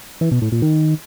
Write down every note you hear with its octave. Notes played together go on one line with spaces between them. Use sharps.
E3
B2
A2
A#2
D#3